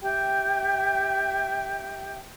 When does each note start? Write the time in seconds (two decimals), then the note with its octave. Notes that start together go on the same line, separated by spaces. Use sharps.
0.02 G4 E5 G5